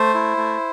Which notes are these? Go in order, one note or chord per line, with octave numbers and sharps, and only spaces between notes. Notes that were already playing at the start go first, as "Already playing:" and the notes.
Already playing: A3 C5
E4
A3